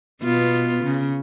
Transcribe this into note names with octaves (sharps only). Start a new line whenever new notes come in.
B2 B3 F4
C#3